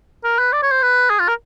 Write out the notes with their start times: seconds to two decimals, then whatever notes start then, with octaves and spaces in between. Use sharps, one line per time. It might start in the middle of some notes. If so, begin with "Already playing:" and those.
0.24 A#4
0.39 B4
0.53 D5
0.62 C#5
0.72 C5
0.82 B4
1.10 G#4
1.20 F4
1.28 A#4